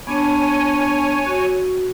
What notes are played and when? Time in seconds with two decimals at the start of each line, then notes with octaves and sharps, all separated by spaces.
0.07 B3 D4 C#5 G#5 A5
1.27 F#4